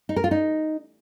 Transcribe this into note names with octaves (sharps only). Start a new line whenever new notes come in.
D#4
A#4
F4
D#4